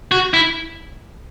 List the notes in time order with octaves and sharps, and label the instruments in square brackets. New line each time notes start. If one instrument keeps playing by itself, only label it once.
[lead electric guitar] F#4
E4